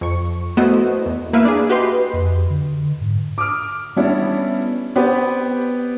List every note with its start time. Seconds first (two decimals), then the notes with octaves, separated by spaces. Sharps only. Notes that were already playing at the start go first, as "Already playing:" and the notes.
0.01 F2 C#6
0.57 A3 B3 E4 F#4 C5 D#5
1.06 E2
1.33 A#3 E4 B4 E5 F5
1.45 D4 G#4
1.69 F#4 G4 B4 D#5 C6
2.13 F2
2.50 D3
3.01 G#2
3.38 D6 D#6 F6 D7
3.96 G3 B3 C#4 D4 E4
4.95 B3 C4 G4 B4 C5 D5